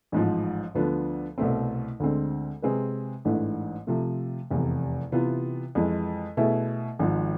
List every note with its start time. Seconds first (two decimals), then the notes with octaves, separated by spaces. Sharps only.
0.12 A1 G#2 F3
0.75 D2 D3 F3 B3 D4
1.38 C2 B2 A3 C4
2.00 D2 D3 G#3 C4
2.62 C3 G#3 C4 G#4 B4
3.25 A1 G#2 E3 A3 D4
3.87 C3 F3 A3
4.51 F1 E2 C3
5.12 C3 E3 B3 F4
5.75 F2 E3 G#3
6.37 B2 A3 E4 G#4
6.99 G#1 G#2 F3